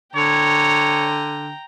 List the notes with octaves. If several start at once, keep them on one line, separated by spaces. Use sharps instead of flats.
D3 C#5 G5 A#5